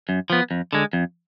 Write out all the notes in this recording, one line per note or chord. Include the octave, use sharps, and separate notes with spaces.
F#2
F3 B3
F2
D3 G#3
F2